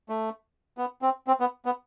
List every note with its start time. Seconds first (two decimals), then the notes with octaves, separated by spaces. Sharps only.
0.09 A3
0.78 B3
1.02 C4
1.27 C4
1.40 B3
1.65 B3